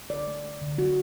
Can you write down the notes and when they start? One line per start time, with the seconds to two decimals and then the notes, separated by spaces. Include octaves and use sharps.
0.10 D3 D5
0.27 A3
0.44 A3
0.62 D3
0.78 D3 F#4